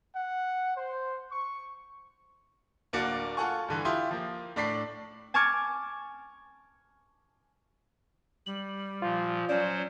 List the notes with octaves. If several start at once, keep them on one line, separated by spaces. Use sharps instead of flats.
F#5
C5
C#6
D1 A#3 D4 F#4 D5 C#7
F4 A4 F#5 G#5 C#6
G2 D3 E3
E4 F4 G4 C6 D#6
F3 A#3
A2 D4 D5 B6 C7
G#5 A5 C#6 D6 F6 G#6
G3 F#7
A#2 F3 F4
F#3 C#4 C5 D5